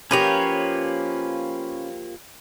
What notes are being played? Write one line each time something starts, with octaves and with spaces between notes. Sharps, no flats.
F3 A#3 C#4 G4 B4 C#5